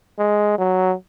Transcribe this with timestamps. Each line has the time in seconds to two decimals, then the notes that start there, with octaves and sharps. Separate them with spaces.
0.19 G#3
0.58 F#3